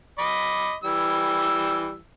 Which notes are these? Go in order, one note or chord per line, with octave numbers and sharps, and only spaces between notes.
D#5 B5 D6
E3 G3 E6